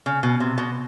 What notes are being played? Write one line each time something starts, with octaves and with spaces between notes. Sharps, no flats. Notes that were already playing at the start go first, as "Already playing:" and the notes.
C#3
B2
C3
B2